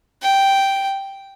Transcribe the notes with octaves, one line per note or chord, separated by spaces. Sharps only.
G5